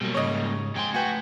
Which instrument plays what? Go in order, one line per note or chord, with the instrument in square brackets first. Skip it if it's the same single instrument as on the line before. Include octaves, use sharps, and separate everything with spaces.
[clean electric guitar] B2 F#3 [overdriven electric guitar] G3 A#3
[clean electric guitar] G#2 C#3 [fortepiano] C#5 D#5
[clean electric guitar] F2 G5 C6 [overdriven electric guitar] G#2 G#5
[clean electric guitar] A3 B4 [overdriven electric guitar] F#4 [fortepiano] G5 G#5